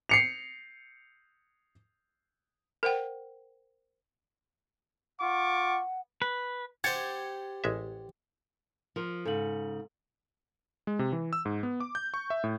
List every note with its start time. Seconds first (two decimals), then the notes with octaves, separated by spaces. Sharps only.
0.09 C7 C#7 F7
2.83 A#4 C5 F#5 G5
5.20 F4 F#5 C#6 D6
6.22 B4
6.84 G4 C5 F#5 G#6 A6 C#7
7.64 A1 G#3 E5
8.96 F3 A#4
9.25 G#2 C#3 A4 F5 F#7
10.87 G#3
10.99 C3
11.13 E3
11.33 E6
11.45 G#2
11.63 B3
11.80 D6
11.95 G6
12.14 C#6
12.30 E5
12.44 A2